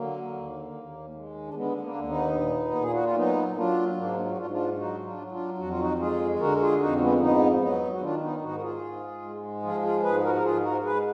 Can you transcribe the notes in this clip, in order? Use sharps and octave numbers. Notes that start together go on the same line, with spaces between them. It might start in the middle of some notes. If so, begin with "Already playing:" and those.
Already playing: D3 F#3 A#3
D#2
D#2
G#3
D4
D3 G#3 B3
A#3 D4
D#2
B3 D#4
A#2
A#2 G#4
F#4
F4
F#3 B3 D#4
F#3 D4 F4
G#2 A#3 D4
F4
F#4
G#2 D4 F4
D4 F4
F#3 D#4 F#4
D4 F4
F#3
D4 F4
F2 F#4
F4
D#4 F#4
G#3 F4 G#4
D3 F#4 A#4
F4 G#4
F2 D#4 F#4
G#3 B3
G#2 B3 D#4
F#3 B3 D#4
F#4
D#3 D4 F4
B3 D#4
G#2 D#4 F#4
A#4
F4 G#4
G#2
G#3
F3 F4 G#4
F4 G#4
G#2 G#4 B4
G#4
F#4 A#4
A#4
G#2 F4 G#4
F#4 A#4
G#2 G#4 B4